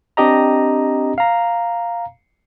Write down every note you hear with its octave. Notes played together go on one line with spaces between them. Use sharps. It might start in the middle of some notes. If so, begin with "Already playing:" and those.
C4 D4 G4 D#5 A#5
F5 A#5